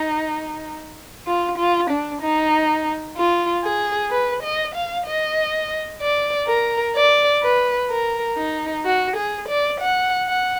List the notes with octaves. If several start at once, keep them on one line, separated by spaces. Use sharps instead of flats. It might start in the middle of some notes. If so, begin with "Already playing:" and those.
Already playing: D#4
F4
F4
D4
D#4
F4
G#4
B4
D#5
F5
D#5
D5
A#4
D5
B4
A#4
D#4
F#4
G#4
D5
F#5
F#5